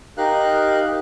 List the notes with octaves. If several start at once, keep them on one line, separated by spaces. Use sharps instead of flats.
D#4 G4 A#4 F5 F#6